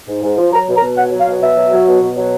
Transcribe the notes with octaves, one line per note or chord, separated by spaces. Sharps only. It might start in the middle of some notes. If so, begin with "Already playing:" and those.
G#2
G#2
F3
F#3 A#5
B2
A#5
B2
F#3 F#5
F#3
F5
B2
B2 E5
F#3
F#3
B2
B2
F#3